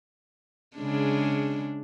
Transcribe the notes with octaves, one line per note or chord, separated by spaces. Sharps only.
C#3 G#3 D4